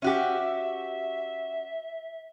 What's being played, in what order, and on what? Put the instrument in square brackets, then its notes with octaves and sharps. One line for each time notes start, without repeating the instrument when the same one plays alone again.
[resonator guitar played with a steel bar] C#4 F#4 G4 [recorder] E5